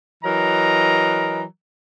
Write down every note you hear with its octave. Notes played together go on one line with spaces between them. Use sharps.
E3 F#3 A#4 D#5 A#5